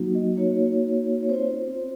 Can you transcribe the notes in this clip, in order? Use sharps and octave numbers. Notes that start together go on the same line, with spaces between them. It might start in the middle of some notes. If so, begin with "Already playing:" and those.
Already playing: F#3 A#3 D#4 F#4
D#5
A#3 D#4 F#4 C#5
C#5
C4 F4 C5